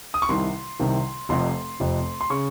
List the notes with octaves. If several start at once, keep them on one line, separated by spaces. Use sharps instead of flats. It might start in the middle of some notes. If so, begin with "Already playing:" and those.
D#6
C#6
C2 C3 D#3 C6
C2 C3 D#3
F1 F2 C3 C6
F1 F2 C3
C6
C#3 C#6